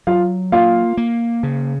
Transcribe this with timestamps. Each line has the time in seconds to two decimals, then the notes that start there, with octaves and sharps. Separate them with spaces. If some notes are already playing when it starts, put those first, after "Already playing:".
0.07 F#3 F4 F5
0.52 A#3 F4 F5
0.97 A#3
1.43 C#3